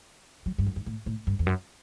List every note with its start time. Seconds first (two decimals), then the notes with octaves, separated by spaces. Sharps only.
0.46 F#3
0.58 G2
0.67 F#2
0.76 G2
0.86 A2
1.06 A2
1.27 G2
1.39 E2
1.47 F#2